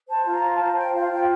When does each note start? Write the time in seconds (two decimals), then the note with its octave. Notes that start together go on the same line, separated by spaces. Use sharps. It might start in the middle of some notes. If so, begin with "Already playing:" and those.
0.09 C5 A5
0.26 F4
0.32 A#5
0.43 C5
0.55 A5
0.60 C5
0.78 C5 G5
0.94 F4 F5
1.11 F4 G5